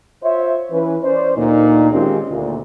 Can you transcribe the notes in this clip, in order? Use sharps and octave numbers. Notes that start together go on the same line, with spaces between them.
F4 C5 C#5 E5
E3 C#4 B4
C#4 C5 D5
D2 A#2 D#4
D#3 G#3 C4 C#4 F4 G4
D2 A#2